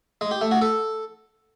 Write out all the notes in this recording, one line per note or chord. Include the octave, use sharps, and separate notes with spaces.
G#3
G4
A3
F#4
A4